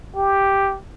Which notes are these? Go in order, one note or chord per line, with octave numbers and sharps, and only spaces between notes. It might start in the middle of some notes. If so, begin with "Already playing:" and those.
G4